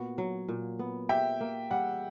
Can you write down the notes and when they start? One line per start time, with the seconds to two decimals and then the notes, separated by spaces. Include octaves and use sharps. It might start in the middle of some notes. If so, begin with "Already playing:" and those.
Already playing: A#2 B3 F#4
0.18 F#3
0.48 A#2
0.79 B3
1.09 G4 E5 G5
1.41 A#3
1.71 G3 F#5